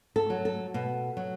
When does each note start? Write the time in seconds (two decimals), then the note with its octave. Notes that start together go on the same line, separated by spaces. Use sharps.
0.16 A4
0.30 F#3
0.45 A4
0.74 B2
1.17 F#3